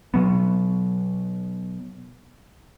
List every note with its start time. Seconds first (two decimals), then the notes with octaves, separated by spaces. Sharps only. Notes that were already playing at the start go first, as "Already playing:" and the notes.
0.14 B2 F#3 B3